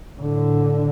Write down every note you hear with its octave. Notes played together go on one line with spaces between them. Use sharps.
A2 D3